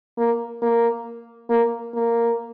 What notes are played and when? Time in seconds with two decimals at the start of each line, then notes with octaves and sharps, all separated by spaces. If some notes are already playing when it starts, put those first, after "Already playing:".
0.18 A#3
0.62 A#3
1.49 A#3
1.94 A#3